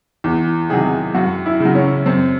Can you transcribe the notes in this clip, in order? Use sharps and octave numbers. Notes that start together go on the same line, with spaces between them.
E2
C3 D#3 F#3 G#4
F#2 F#4
E4
C#3 F#3
C#4
F#2 C4